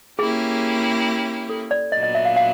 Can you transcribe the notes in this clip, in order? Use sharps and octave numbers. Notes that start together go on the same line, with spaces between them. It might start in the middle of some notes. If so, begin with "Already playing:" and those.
A#3 C#4 E4 G4 G#4
A4
D5
A#2 F#3 B3 D4 D#5
D#5
E5
F5
F5